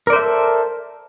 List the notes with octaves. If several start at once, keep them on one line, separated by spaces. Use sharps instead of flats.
A4 A#4 C5 D5 E5